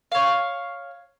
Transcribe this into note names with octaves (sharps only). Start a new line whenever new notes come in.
C#5 F5